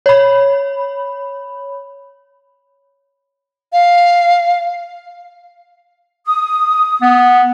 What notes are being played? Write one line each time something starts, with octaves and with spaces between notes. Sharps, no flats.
C#5 B5
F5
D#6
B3